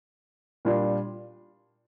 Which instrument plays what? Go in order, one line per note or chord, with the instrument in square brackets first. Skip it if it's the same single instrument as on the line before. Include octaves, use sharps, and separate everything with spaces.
[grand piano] A#2 G3 D4 F4